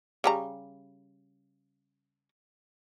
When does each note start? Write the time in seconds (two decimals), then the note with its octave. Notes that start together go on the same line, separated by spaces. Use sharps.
0.24 C#3 G3 A#5